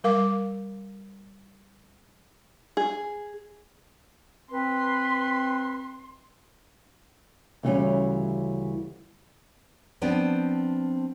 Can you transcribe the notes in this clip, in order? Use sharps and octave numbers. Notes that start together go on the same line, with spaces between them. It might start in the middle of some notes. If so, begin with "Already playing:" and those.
G3 A#4 F5 D6
G#4
C4 B4 C6
D2 C#3 E3 G3 B3 C#4
F3 B3 C4 D4